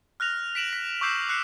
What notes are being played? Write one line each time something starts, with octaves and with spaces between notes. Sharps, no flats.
F6 F#6 A#6 F7
B6 D7 E7 F#7
B6
C#6 D6 E6 G6 C7 E7
F6 F#6 C7 C#7